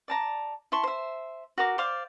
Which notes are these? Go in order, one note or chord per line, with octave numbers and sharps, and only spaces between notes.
D5 A5 A#5
E4 A5 C6 C#6
C5 E5
F#4 A#4 D6
C5 D5 F5 D6